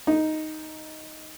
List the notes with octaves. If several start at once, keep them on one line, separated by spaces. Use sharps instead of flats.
D#4